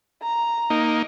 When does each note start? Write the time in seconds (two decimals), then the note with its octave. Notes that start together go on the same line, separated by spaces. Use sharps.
0.22 A#5
0.70 A#3 D#4